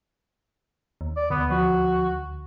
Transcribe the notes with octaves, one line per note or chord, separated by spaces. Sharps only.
D#2
D5
D2 B3
F3 F#4